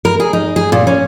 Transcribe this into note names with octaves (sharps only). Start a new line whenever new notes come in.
A#4
G#4
D#4
G#4
A#2
C#4